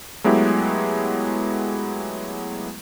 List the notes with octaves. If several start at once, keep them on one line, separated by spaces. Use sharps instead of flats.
F#3 G#3 A3 B3 E4 G4